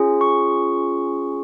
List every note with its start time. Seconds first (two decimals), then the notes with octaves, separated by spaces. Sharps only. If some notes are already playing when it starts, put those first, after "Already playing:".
Already playing: C#4 F4 G#4
0.21 C#6